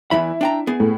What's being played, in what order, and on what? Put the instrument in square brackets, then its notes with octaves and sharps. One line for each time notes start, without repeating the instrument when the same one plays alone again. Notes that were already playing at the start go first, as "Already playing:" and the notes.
[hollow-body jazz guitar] E2 E3 B5 [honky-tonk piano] E4
[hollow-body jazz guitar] D4 G5 A#5
B3 G#4
[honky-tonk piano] A2